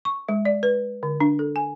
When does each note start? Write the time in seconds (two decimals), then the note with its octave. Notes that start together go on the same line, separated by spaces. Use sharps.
0.05 C#6
0.29 G#3
0.45 D5
0.63 B4
1.03 D3
1.20 D4
1.39 A4
1.56 G#5